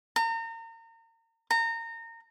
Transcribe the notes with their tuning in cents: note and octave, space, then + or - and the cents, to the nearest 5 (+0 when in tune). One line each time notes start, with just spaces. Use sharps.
A#5 -35
A#5 -25